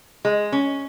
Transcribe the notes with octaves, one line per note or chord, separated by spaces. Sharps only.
G#3
C#4